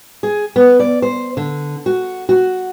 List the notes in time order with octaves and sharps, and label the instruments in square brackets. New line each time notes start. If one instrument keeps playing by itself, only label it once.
[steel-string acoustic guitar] G#4
B3
D5
C5
D3
F#4
F#4